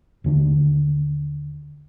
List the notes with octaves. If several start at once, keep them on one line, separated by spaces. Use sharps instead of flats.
D#2 D3 D4